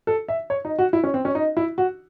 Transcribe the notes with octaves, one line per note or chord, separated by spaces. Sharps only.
A4
E5
C#5
D#4
F#4
E4
C#4
C4
C#4
D#4
E4
F#4